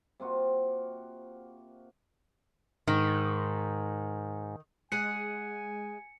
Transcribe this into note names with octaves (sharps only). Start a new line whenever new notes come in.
C3 A#3 F4 F#4
G#2 D#3
G#3 G#4 F#5 G#5 C#7